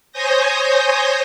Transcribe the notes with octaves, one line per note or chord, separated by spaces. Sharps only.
C5 C#5 G#5 D#6 G6 A#6